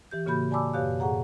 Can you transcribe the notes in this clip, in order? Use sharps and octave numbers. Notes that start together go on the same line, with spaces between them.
E3 G4 G6
A2 C#3 A#3 F#4 B5 G6
D5 G#5 A5 B5 D6 E6
F#2 B2 G4 C#5 F5 F#6
A2 G#4 F#5 A#5